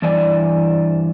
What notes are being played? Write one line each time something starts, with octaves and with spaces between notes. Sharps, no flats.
G2 E3 D5 E5 G#5